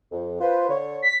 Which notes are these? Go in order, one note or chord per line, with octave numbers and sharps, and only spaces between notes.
F2
F4 B4 C5
D3 C#5
B6